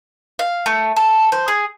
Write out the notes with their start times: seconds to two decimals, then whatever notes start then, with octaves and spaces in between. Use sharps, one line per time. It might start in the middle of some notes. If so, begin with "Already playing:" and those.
0.39 F5
0.66 A3
0.96 A4
1.32 C5
1.48 G#4